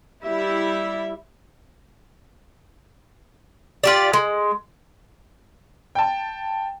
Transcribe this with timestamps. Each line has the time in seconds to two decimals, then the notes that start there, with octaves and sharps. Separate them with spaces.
0.24 G3 E4 E5
3.84 F4 G4 D5
4.13 G#3
5.95 G5 A5